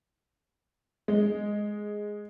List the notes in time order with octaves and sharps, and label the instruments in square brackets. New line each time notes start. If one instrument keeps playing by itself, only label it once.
[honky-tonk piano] G#3